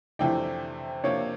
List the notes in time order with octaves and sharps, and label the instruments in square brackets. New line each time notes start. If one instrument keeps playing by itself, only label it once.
[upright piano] F2 C3 E3 A3 D4 [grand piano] G5
[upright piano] C3 F3 A#3 D4 [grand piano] C#5